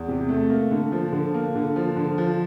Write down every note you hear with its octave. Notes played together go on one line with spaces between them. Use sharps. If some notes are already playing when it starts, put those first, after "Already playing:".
Already playing: E2
C3
A3
A#3
D3
F3
D3
A#3
D3
F3
D3
F3